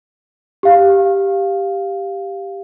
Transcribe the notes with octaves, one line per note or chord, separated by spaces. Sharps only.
G4 F5